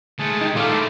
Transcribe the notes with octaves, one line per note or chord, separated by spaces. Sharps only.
D#3 G#3 A3 A5
D#3 D#4 G4
A#2 D#3 A3 F4 D5 F5
E4 A4 C5